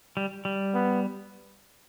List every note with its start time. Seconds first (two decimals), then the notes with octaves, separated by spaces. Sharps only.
0.17 G3
0.45 G3
0.74 B3